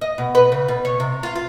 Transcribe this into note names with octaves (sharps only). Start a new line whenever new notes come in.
D#5
B2
B4
C#3
B2
C#5
C3
F4
F4